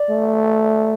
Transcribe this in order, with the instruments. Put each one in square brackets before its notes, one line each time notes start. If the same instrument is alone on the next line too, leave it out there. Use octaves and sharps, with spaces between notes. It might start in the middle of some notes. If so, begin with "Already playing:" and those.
Already playing: [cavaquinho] D5
[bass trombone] A3